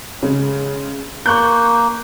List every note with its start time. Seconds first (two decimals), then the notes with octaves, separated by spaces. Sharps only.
0.22 C#3 G#3
1.26 A#3 C#6 F#6 G6